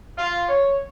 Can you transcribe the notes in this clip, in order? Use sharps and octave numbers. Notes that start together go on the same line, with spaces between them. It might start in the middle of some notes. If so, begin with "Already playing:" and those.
F4
C#5